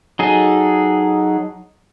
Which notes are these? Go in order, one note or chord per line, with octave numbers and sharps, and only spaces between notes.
F#3 D#4 G#4 A4